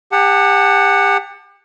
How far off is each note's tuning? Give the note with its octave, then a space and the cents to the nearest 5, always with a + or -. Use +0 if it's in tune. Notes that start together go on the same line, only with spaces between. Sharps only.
G4 +35 F#5 +0 A5 +5